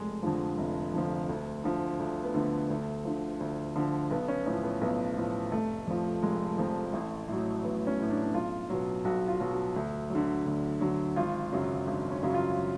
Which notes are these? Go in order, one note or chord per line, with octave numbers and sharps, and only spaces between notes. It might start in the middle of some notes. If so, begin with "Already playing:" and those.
Already playing: F1 G#3
F2 D3 F3
F1
F2 D3 F3
D2
D3 F3
D2
B3
D3 F3 A3
D2
D3 F3
D2
D3 F3
B1 B3
C#4
A2 F3 C#4
B3
B1 B3
A2 F3
F1 A3
F2 F3
F1 G#3
F2 F3
A1 A3
A2 F#3
A1 B3
C#4
A2 F#3
D4
D4
B1 F4
B2 F#3
B1 F#4
F4
B2 F#3
F#4
D2
D3 F#3
D2
D3 F#3
G#1 F4
F#2 C#3 F#3
G#1 D4
C#4
F#2 C#3 F#3
F4